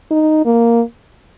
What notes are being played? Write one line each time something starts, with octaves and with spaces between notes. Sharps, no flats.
D#4
A#3